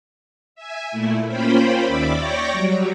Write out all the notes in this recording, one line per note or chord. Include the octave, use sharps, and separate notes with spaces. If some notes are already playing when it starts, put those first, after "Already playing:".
E5 G#5
A#2 A3 E4
A#3 C#4 F4 C5 G5 B5
D#2 D5 E5 B5 D6
C#5 D5 G5 C#6 D6 A#6
F#3 G3